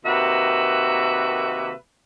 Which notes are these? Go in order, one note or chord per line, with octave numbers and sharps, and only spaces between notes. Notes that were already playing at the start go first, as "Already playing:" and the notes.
C3 D#3 A#3 F#4 B4 E5